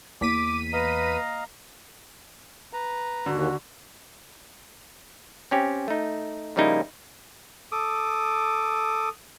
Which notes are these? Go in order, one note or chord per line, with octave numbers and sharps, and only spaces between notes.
E2 A#3 D6 B6 D#7
B4 D#5 F5 A#5
B4 A#5
D#2 D3 F#4
C4 C#4 G4
A3 D#4
C#3 F3 G3 A#3 D#4 E4
A4 D6 D#6